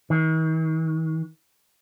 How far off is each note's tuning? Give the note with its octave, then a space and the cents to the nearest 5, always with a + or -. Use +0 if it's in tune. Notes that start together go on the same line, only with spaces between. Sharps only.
D#3 +45